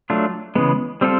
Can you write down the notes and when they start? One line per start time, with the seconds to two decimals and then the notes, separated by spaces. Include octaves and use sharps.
0.10 F#3 A3 D4 F4
0.55 C#3 E3 G#3 B3
1.01 G3 C4 F4 A4